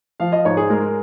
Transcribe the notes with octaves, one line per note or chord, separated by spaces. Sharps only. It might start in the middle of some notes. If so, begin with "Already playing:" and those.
F3 F5
D#5
G#2 C#5
G#4
G#3 A#4